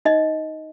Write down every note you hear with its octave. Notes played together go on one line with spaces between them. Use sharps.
D#4 D#5